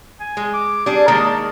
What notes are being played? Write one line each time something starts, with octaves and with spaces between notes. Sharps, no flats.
G#5
G#3
D6
G3 D4 G#4
D#3 G#3 A#3 A5